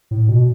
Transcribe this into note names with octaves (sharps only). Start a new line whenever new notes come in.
A2
B2